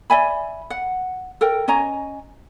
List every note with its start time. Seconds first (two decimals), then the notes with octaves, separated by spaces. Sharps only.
0.10 D5 E5 G#5 B5
0.70 F#5
1.41 A4 A#4 G5
1.68 C#4 D#5 G#5 A#5